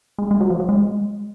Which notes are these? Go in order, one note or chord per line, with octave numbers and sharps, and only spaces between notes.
G#3
G#3
F#3
F3
F#3
G#3